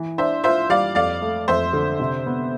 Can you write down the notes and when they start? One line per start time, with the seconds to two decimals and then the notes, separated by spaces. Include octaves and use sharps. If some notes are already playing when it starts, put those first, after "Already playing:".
Already playing: E3
0.18 D4 C5 E5
0.44 F4 C5 E5
0.70 G3 D5 F5
0.95 F2 D5 F5
1.22 A3
1.48 F2 C5 E5
1.73 D3
2.00 C3
2.26 B3